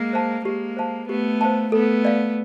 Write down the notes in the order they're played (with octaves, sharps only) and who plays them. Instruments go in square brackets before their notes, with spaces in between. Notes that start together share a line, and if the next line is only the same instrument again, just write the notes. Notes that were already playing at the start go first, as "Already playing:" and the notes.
Already playing: [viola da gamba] G#3 A#3
[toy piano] C5 F5 A5
[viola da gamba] G#3 A#3 [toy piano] G4
[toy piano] C5 F5 A5
[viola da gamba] A3 B3 [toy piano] G4
[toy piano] C5 F5 A5
[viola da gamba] A3 B3 [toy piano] A4
[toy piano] D5 F5